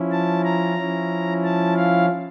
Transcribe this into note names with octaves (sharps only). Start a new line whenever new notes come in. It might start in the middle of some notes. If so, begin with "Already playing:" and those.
Already playing: F3 C#4 E4
A5
A#5
F3 C#4 E4
A5
F5